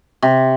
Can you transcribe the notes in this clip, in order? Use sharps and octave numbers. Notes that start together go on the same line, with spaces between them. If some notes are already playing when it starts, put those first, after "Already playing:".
C3